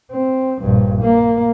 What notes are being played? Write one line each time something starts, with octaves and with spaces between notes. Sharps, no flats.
C4
A#1 G2
A#3